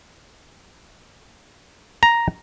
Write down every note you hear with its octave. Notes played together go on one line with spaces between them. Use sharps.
A#5